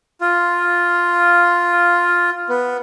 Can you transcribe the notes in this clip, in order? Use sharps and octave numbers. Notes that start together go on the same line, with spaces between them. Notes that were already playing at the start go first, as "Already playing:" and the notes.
F4
B3